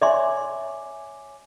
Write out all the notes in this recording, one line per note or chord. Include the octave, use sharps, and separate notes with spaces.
C#5 D5 E5 G#5 C6 D6